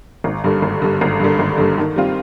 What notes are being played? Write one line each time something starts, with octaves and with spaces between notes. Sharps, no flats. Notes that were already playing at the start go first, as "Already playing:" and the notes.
G#1
G2 D3
G#1
G2 D3
G#1
G2 D3
G#1
G2 D3
D#3
G3 C4 F4